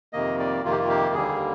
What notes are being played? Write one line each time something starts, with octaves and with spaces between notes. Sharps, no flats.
F2 C3 D#3 A#3 D#5
D5
F2 C3 D#3 A#3 F4
G4
F4
G4
D#2 D3 G3 A#3 G#4